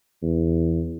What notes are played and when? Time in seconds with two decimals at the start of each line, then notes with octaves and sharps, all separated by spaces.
0.22 E2